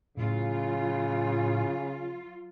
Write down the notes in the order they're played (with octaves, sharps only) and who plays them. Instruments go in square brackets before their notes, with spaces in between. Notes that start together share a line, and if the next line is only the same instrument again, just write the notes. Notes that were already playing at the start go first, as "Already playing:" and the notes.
[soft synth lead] A2 [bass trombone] C#3 [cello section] F#3 F4